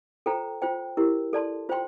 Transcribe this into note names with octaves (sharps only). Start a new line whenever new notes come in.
F4 A4 C5 G5 A#5
F4 C5 G5
E4 G4 A#4
A4 D5 A5 C6
F4 C5 G5 C6